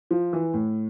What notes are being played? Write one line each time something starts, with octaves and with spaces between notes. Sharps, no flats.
F3
E3
A2